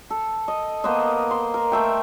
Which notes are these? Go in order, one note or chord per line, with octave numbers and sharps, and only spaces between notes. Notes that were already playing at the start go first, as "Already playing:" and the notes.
A4
D#5
A#3 B3 C5 D#5
C6
A#4
A3 E5 G5